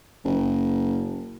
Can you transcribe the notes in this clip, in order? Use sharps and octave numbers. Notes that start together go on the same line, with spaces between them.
F#1